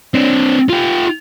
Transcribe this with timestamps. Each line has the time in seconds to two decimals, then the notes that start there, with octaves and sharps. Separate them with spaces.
0.14 C4 D4
0.69 F4 G4